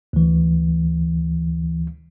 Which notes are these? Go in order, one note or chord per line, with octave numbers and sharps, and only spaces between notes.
D2 E3